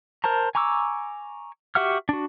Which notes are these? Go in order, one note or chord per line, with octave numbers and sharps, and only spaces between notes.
A#4 C5 A5 A#5
G#5 A#5 C#6 D6 E6
F#4 G4 E5 F#5 F6
D4 F#4